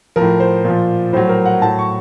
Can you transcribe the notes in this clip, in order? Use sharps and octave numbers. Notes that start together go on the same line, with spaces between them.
A2 F3 A#4
C5
A#2 F3
A2 F#3 C5
A#4
F#5
A2 F#3 A5
C#6